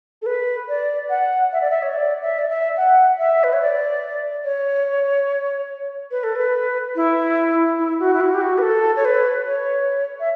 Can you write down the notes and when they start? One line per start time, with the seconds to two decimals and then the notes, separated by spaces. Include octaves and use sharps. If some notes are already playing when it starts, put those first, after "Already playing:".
0.22 A4
0.26 B4
0.69 D5
1.10 F#5
1.53 E5
1.61 D5
1.71 E5
1.82 C#5
1.94 D5
2.22 E5
2.39 D5
2.49 E5
2.77 F#5
3.19 E5
3.44 B4
3.53 C#5
3.62 D5
4.44 C#5
6.11 B4
6.24 A4
6.35 B4
6.96 E4
7.79 E4
8.00 F#4
8.14 E4
8.21 F#4
8.34 G4
8.41 F#4
8.58 B4
8.62 A4
8.96 C#5
9.05 B4
9.46 C#5
10.20 E5